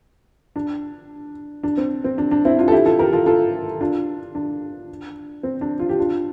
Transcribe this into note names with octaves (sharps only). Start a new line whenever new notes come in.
D4
D4
C4
C4
D4
D4
C4 E4
D4 F4
A4
E4 G4
F4 A4
G4 A#4
F4 A4
F4 A4
D4 F4
D4
C4
D4
F4
G4
D4 F4